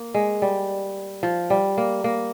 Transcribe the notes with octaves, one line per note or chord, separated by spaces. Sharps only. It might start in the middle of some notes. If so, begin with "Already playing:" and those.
Already playing: A#3
G#3
G3
F3
G3
A#3
A#3